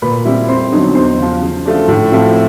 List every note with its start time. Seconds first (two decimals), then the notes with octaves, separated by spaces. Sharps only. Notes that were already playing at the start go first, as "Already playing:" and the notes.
0.02 A#2 B4 B5
0.25 G3 C4 E4
0.48 F2 C5 C6
0.72 D3 F#3 B3 D#4
0.95 E2 C5 C6
1.18 C#3 F3
1.42 C#3
1.65 F3 A3 D4
1.88 A2
2.12 F3 A3 C4 E4